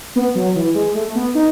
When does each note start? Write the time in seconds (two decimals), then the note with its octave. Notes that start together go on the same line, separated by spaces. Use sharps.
0.16 B3
0.35 F#3
0.55 E3
0.75 G#3
0.95 A3
1.15 B3
1.35 D#4